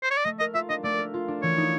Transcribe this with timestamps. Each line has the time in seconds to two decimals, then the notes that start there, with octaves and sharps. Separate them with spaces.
0.03 C5
0.11 C#5
0.17 D5
0.25 A3 D#5
0.40 A#4 D#5
0.54 F4 E5
0.69 D4 D#5
0.83 A3 D5
0.98 A#4
1.14 F4
1.28 D4
1.42 E3 C#5
1.57 D#4